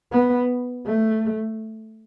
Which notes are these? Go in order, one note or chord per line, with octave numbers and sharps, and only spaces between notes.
B3
A3